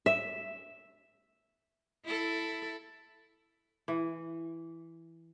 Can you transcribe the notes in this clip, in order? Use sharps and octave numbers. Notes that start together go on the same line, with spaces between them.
E5
E4 A4
E3